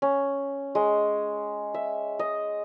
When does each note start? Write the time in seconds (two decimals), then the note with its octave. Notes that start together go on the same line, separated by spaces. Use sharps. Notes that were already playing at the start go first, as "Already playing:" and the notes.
0.02 C#4
0.75 G#3
1.74 E5
2.19 D#5